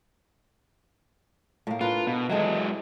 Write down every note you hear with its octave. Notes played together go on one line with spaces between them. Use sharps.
A2 A#3
D4 F4 A#4 B4
B2
D#3 E3 F#3 G#3 A4
D5